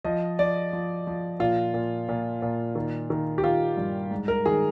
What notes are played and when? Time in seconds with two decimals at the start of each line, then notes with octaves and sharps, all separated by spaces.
0.04 F3 D#5
0.39 F3 D5
0.73 F3
1.07 F3
1.40 A#2 F4
1.74 A#2
2.09 A#2
2.42 A#2
2.75 D#3
3.10 D#3
3.38 G4
3.44 D#3 F4
3.77 G2
4.11 G#2
4.28 A#4
4.46 D#3 G#4